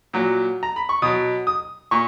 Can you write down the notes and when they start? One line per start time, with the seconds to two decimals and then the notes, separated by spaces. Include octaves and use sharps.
0.13 A#2 F#3
0.63 A#5
0.76 B5
0.89 C#6
1.02 B2 F#3 D#6
1.47 D#6
1.91 A#2 C#6